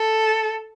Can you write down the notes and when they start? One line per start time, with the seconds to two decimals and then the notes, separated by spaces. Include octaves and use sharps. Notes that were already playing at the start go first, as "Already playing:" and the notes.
Already playing: A4